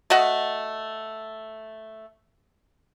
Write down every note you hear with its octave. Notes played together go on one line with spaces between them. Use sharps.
A3 F#4 D#5 F#5